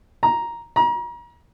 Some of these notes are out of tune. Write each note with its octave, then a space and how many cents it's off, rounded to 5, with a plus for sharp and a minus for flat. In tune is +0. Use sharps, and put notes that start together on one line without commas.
A#5 +5
A#5 +35